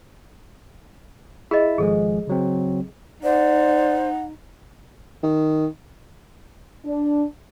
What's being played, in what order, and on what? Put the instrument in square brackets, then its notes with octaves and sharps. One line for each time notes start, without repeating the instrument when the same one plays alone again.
[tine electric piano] E4 E5 [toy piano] G#4 D#5
[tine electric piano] G#1 F3 G#3 [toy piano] G#4 A4
[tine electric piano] C#3 F#3 C4
[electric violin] D#4 [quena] C5 [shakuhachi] D5 [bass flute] F#5
[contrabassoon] D#3
[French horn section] D4